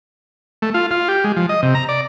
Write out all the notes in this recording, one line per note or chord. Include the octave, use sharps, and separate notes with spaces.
A3
F4
F4
G4
G#3
F3
D#5
C3
A#5
D5